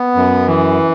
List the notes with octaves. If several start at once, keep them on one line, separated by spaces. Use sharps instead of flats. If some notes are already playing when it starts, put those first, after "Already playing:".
Already playing: B3
F#2
E3